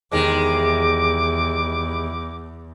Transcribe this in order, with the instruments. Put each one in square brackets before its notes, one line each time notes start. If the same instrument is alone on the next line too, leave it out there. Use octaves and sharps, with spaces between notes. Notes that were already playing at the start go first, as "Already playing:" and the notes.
[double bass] E2 [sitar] C3 D#3 G#3 [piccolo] D6